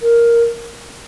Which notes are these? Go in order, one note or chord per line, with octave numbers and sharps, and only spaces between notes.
A#4